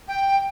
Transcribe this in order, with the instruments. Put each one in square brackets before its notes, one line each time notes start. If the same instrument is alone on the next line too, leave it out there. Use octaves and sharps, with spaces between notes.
[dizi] G5